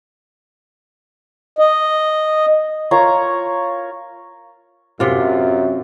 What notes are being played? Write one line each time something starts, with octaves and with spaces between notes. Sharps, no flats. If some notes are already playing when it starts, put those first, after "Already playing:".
D#5
F4 A#4 C#5 A#5
F#2 C3 F4